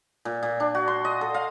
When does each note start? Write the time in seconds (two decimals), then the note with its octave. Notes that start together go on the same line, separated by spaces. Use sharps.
0.25 A#2
0.43 A#2
0.60 D4
0.75 F#4
0.88 C6
1.05 D#5
1.21 A4
1.34 F5